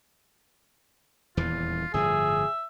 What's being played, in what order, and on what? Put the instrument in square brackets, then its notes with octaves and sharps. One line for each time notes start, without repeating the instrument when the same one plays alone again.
[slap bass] D#1 E2 E3 [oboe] F4
[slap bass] G1 A2 F3 [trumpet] G#4 [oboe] E5